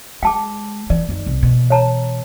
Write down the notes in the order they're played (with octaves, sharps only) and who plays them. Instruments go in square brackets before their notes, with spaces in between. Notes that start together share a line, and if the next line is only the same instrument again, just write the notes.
[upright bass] G#3 [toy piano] G5 A5 D6
[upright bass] E3 [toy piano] D5
[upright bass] F#2 D#3
C2 C#4
B2 E3
[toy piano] C#5 A5 A#5